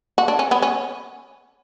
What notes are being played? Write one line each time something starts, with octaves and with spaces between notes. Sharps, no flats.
F#4
D4
C#4
B3
C#4